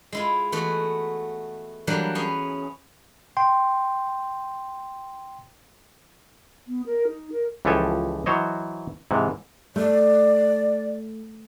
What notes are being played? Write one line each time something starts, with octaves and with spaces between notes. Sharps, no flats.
G#3 E4 F4
E3 A3 B3 F#4
E3 F#3 G3 A#3 D4
B3 C#4 G#4
G5 C6
B3
A#4
D#4
A#4
C#2 E3 F3 G4 A4 G#5
E3 F#3 C5 C#5 D#5
G#2 C3 E3
A3 D5